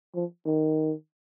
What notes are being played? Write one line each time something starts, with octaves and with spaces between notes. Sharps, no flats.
F3
D#3